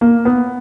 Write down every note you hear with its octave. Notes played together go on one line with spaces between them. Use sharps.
A#3
B3